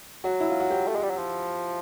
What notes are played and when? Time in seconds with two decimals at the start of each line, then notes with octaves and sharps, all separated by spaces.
0.24 F#3 F#4
0.40 E4
0.50 F4
0.60 F#4
0.70 G4
0.87 A3
0.95 G#3
1.03 G3
1.10 F#3
1.17 F3